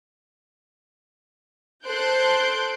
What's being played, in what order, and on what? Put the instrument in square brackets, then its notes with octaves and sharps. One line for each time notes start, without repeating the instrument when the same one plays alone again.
[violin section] A4 C5 C6 F#6 G6 D7